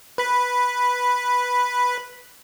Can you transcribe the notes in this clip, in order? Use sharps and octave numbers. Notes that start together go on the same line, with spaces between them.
B4 B5